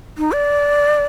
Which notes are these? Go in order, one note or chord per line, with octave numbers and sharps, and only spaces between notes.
D#4
D5